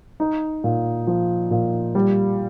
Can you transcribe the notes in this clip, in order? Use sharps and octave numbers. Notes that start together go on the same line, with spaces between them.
D#4
A#2
F3
A#2
G3